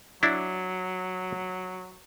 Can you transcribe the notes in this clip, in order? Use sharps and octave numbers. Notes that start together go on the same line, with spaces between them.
F#3 D4 E4